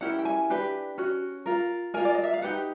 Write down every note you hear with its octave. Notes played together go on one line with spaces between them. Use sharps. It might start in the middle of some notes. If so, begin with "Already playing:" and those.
C#4 E4 G4 A#4 F#5
G5
G#5
D4 G4 B4
C#4 F#4
F4 A#4
F4 A#4 G#5
D5
D#5
E5
F5
D#4 G4 B4 F#5